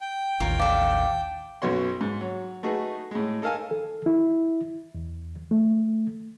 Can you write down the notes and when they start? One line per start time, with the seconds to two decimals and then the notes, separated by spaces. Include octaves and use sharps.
0.01 G5
0.40 A1 D#2 F4 A#4 C#5
0.60 A4 D5 F5
1.62 B1 F#2 B2 F#4 C#5 C6
2.01 G#2
2.21 F#3
2.63 A3 D#4 F#4 G#4 B4
3.11 A2 G#3
3.42 D#4 A4 A#4 F5 G#5
3.71 A4
4.06 E4
4.95 E2
5.51 A3